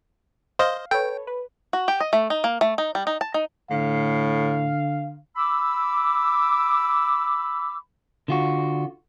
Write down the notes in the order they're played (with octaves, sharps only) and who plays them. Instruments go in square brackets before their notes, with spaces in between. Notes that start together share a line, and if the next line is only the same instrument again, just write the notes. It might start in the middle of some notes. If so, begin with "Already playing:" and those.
[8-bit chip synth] C5 D#5 [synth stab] F5
[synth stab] A4 B4 C#5 [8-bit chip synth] G5
[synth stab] B4
[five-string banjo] F#4
G4
D#5
A3
D#4
A#3
A3
D#4
G3
D#4
A5
D#4
[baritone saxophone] A2 [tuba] D3 [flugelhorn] F5
[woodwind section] B5 D6 E6
[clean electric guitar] D3 F4 F#4